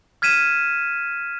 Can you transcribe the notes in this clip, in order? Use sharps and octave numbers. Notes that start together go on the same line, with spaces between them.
F6 G#6 B6 D#7 E7